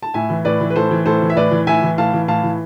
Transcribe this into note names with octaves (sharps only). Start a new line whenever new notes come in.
A5
A2 E5 G#5
E3
A2 B4 D5
E3
B4
A2 A4 C5
E3
A2 A4 C5
E3
E5
A2 B4 D5
E3
A2 E5 G#5
E3
A2 F5 A5
E3
A2 F5 A5
E3